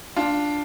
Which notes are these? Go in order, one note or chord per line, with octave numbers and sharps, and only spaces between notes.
D4 F4